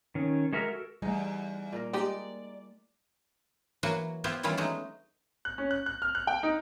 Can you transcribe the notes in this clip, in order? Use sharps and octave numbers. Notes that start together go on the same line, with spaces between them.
D#3 C#4
G#3 F#4 A#4 E5 F6
F#4 A4 A#4
E2 G3 A3 D#4 G#4
A#2 A#3 A#4
G#3 A#3 D#4 G4 D5
E3 F#3 A#3 F#4
B3 E4 F4 G4 C5
D#3 E3 G3 C#4 E4 F4
F#3 G#3 A3 D#4
F#6
C#4
F#6
F#6
F6
F#6
G5
D#4